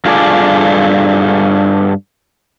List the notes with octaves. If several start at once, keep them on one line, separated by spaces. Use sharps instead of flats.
G2 F4 G#4 A4 D5